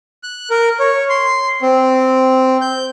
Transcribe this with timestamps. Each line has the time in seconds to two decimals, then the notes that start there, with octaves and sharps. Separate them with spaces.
0.23 F#6
0.50 A#4
0.79 C#5
1.09 C6
1.62 C4
2.61 G6